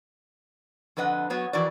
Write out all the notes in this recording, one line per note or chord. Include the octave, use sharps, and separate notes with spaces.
F2 D3 B4 D#5 F#5
F#3 B3 C#5
F2 E3 E4 F#4 A#4 D5